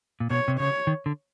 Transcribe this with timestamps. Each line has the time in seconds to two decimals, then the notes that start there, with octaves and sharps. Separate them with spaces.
0.20 A#2
0.31 B2 C#5
0.48 C3
0.59 C#3 C#5
0.87 D#3
1.06 D3